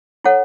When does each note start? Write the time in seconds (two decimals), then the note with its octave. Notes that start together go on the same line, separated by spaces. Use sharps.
0.24 E4 A4 C#5 F#5